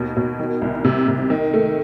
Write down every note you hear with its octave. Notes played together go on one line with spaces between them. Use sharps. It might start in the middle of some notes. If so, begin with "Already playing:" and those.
Already playing: D#2 B2
B2
D#3
C2
C3
C3
D#3
A3